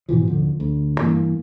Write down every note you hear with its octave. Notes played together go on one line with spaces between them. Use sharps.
G#2 B2 E3 F3
D#1 D3 F3
D2
G2 E3 A#3